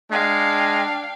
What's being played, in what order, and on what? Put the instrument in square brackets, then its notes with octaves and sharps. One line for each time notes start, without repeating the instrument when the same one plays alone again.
[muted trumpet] G#3 [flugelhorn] D4 [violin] F5 G5